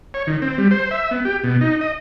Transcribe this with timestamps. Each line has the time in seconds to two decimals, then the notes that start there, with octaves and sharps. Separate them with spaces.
0.14 C#5
0.27 D#3
0.42 C4
0.58 G3
0.71 C5
0.91 E5
1.11 B3
1.25 G4
1.44 B2
1.61 D#4
1.81 D#5